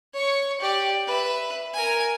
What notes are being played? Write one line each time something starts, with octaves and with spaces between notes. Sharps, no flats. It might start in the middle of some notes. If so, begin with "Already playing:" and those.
C#5 C#6
G4 D5
B4 E5
A#4 G#5